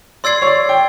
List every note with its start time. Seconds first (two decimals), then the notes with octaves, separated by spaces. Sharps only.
0.24 D5 C6 E6 G#6 C7
0.42 C#5
0.47 D5
0.69 G5